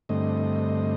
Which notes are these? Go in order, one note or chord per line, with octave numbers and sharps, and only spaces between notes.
G2 D3 A3 C4 D#5